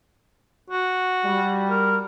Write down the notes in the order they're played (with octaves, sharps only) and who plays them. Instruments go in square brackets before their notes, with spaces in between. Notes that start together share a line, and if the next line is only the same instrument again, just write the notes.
[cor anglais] F#4
[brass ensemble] G3
[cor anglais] A#4